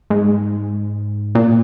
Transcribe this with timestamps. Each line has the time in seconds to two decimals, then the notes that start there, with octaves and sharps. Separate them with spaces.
0.10 G#2
1.35 A#2